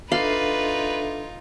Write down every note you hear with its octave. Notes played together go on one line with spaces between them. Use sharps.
D4 D#4 F4 A4 B4 E5 F5